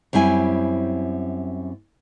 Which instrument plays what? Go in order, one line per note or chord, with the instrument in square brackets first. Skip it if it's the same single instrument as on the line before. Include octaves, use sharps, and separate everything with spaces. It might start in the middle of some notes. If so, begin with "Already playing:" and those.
[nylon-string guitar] F#2 G3 C4 E4 G#5